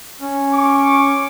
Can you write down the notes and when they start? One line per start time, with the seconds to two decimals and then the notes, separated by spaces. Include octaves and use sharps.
0.20 C#4
0.53 C#6 D6